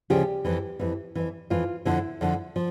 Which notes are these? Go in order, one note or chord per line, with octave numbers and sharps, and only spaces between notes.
D2 C#3 F3 G4
F2 E3
F2 E3
F2 E3
F2 E3 F4
F2 D3 F3 E4
F2 D3 F3
F3